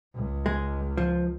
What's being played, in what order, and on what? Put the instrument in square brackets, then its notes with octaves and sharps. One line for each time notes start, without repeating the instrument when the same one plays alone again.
[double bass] C#2
[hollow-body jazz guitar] G#3
F3